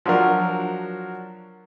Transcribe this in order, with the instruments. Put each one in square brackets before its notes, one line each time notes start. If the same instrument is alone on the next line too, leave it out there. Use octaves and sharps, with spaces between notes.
[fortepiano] F3 F#3 D4 F#4 A#4